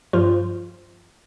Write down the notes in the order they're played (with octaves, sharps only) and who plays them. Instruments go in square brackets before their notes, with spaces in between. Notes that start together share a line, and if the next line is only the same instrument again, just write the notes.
[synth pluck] G2 F3 F4